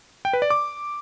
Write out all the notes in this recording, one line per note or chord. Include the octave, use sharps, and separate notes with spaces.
G5
B4
D5
D6